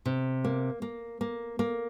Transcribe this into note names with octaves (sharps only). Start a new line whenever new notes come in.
C3
A#3
A#3
A#3
A#3